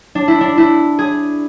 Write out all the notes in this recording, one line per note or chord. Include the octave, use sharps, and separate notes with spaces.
D4
E4
D4
E4
G#4